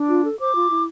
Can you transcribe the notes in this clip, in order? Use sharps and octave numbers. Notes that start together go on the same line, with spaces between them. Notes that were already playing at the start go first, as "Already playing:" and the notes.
Already playing: D4
F4
A4
C5 D6
F4
E4